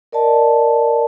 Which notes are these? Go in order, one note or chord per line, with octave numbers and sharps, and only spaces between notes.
A#4 D5 D#5 A5